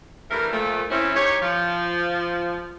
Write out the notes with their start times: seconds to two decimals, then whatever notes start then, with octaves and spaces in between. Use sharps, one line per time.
0.30 G2 E3 A3 A#4
0.52 A#2 F3 A3
0.90 E3 C4 C#4 E4
1.15 D#4 G4 C#5
1.42 F3